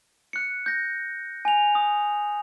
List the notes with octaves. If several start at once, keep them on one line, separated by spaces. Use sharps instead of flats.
F#6 C#7
G6 A#6
G#5 F7
D#6